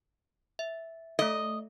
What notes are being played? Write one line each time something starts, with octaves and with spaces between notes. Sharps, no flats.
E5
A3 A4 D#5